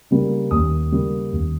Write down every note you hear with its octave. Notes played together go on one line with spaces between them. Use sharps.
C#3 G3 A#3
D#2 D#6
C#3 G3 A#3
D#2